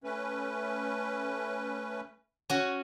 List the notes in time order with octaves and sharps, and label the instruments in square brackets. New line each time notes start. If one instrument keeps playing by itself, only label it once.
[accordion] A3 C#4 B4
[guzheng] C#4 F#4